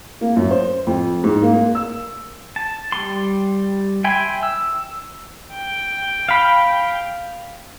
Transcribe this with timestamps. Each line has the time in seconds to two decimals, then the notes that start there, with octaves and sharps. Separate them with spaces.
0.21 A#3
0.36 F#2
0.51 C5
0.87 F2
1.24 G#2
1.42 A#3
1.54 A#3
1.75 E6
2.56 A5
2.92 G3 C6
4.04 E5 G5 G#5 B5 C6
4.43 E6
5.54 G5
6.29 F5 B5